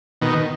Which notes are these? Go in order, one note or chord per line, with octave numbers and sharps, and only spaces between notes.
B2 D#3